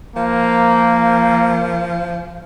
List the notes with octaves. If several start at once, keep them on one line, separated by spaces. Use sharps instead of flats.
F3 A#3